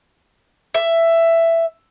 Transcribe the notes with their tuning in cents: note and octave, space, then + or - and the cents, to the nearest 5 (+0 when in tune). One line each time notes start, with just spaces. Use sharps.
E5 +10